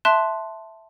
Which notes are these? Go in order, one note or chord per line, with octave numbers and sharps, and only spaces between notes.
E5 A5 C6 F#6 E7